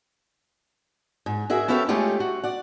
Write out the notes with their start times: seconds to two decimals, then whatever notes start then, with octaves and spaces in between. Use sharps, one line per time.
1.26 G#2
1.50 F#4 G#4 A#4 E5
1.68 B3 C#4 A4 E5 F5 G5
1.88 G#3 A3 C#4 F4 G4 A4
2.20 F#4
2.44 D5 F#5